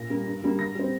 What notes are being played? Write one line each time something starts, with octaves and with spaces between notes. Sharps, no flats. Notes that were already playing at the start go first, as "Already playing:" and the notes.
Already playing: A#2 A#6
G3 A#3
G2
D3 G3 A#3
D3 A#6
G3 C4